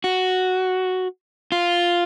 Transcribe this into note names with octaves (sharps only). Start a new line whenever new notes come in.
F#4
F4